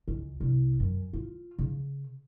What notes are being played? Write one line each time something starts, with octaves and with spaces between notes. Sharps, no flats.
C#2
C2
F#2
F4
C#3